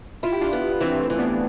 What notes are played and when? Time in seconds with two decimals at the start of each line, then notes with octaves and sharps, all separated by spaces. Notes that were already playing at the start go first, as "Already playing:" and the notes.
0.23 E4 F4
0.32 G4
0.41 D4 F4
0.53 B3
0.80 E3 C4 E4
1.00 A3 C4
1.10 E3
1.19 B3 D4